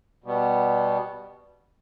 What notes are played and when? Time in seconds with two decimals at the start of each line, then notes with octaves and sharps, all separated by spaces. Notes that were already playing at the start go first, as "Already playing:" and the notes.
0.24 B2 G3 B3